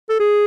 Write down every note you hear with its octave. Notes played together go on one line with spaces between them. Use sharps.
A4
G#4